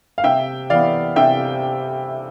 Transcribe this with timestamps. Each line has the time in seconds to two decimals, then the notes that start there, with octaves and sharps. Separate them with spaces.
0.18 F5
0.24 C3 E5 G5
0.70 E3 B3 D5 F5
1.16 C3 E5 G5